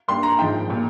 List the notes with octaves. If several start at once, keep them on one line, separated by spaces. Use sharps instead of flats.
G2 G3 A#3 C6
A#5
G#2 F3 G#3 G5
A#2 G3 A#3